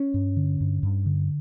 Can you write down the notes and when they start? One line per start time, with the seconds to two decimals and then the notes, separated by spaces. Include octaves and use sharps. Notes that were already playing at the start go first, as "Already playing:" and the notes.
Already playing: C#4
0.14 G2
0.37 D3
0.61 G2
0.83 G2
1.06 D3